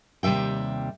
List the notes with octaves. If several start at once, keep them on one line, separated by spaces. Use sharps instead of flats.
D#2 C3 G3 E5 G5